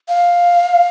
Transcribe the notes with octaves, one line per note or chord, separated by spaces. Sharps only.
F5